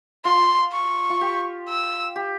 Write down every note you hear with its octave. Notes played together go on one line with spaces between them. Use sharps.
F4 C6
C#6
F4
G4
E6
G4